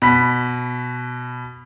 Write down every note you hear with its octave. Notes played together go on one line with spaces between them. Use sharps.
B2 B5 B6